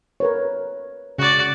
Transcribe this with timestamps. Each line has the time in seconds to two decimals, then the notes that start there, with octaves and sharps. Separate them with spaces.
0.20 A#4 B4 C#5
1.18 C#3 F#4 D5